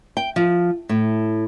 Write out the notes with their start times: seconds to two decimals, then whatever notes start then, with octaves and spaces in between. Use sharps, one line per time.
0.17 G5
0.36 F3
0.89 A2